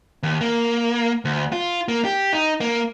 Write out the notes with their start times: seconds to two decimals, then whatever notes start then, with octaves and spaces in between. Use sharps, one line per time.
0.23 D#2
0.41 A#3
1.25 D2
1.52 F4
1.88 A#3
2.05 G4
2.33 D#4
2.60 A#3